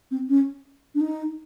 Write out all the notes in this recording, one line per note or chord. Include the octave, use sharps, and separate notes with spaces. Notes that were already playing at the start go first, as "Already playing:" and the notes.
C4
C#4
D4
D#4